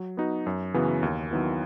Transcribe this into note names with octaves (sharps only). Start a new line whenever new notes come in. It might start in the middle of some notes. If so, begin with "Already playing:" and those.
Already playing: F#3
B3 D#4 F#4
F#2
C#3 E3 B3 F#4
D#2
D#3 F#3 B3 E4